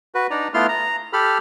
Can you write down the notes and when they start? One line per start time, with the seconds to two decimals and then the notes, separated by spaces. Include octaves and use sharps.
0.15 F#4 B4
0.30 D4 D#4 D5 A#5
0.54 A3 B3 E4 F4 C6 F6
0.69 A#5
1.13 G4 A4 B5 F6